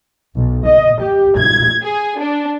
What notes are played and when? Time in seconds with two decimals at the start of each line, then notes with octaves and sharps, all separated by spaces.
0.36 B1
0.65 D#5
1.02 G4
1.38 G#6
1.84 G#4
2.20 D4